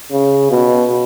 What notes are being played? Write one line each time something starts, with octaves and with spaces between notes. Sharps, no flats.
C#3
B2